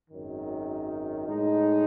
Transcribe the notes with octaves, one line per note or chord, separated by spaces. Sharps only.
G#1 F#2 D#3
A2 G#3 D#4